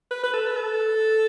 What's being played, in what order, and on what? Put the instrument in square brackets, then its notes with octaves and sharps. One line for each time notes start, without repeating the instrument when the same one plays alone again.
[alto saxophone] B4
B4
A4
B4
A4